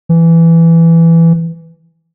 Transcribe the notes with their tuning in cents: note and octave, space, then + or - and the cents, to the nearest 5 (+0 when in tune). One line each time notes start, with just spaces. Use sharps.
E3 +10